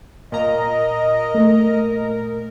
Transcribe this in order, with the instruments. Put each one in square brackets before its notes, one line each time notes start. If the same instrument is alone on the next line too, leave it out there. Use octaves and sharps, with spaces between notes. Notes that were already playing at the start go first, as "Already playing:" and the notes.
[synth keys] A#2 A#5 [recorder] A#4 [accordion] D#5
[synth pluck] A3